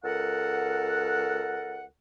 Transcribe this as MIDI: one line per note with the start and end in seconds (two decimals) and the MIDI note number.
0.04 1.84 37
0.04 1.84 69
0.04 1.84 70
0.04 1.84 78